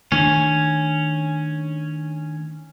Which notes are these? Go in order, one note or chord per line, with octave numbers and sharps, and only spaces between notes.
D#3 A3 C#4 D4